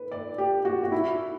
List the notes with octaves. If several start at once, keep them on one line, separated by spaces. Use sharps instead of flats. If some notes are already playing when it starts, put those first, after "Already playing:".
Already playing: B4
D5
G4
F#4
F#4
E4